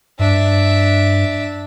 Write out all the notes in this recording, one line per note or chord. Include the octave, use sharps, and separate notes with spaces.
G2 D4 E5